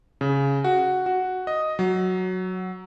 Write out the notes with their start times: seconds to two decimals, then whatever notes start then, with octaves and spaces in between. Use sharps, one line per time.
0.21 C#3
0.64 F#4
1.06 F#4
1.47 D#5
1.79 F#3